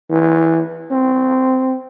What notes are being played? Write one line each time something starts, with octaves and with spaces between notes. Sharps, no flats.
E3
C4